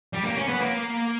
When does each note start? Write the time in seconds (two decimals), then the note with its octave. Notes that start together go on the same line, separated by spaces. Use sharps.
0.14 G3
0.25 A#3
0.37 C#4
0.49 B3
0.61 A#3